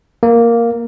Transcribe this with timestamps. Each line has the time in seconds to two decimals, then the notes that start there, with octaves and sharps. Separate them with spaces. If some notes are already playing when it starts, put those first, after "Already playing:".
0.23 A#3